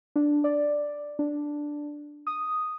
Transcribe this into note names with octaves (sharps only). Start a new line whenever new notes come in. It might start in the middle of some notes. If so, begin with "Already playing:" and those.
D4
D5
D4
D#6